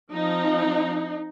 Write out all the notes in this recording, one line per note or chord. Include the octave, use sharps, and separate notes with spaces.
F3 C4 D#4